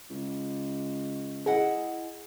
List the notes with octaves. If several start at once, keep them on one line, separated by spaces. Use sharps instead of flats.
C#2
E4 G#4 D#5 F#5